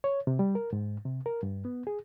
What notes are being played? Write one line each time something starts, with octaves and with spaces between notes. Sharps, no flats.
C#5
C3
G3
A#4
G#2
C3
A#4
G2
B3
G#4